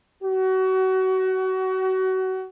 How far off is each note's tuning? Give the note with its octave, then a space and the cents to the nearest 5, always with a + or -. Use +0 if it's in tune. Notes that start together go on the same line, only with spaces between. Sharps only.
F#4 +30